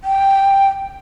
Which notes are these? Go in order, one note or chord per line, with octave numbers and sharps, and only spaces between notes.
G5